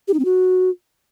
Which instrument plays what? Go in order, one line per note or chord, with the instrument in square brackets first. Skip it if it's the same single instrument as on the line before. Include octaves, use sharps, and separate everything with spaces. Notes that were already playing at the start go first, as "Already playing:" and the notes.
[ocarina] G4
D#4
C4
F#4